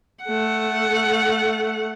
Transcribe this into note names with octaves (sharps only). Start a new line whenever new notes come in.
A3 F#5